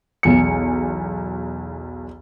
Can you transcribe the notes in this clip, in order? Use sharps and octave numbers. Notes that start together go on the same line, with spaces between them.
B1 E2 C#7